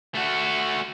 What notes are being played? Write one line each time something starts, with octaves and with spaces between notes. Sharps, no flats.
A3 F#4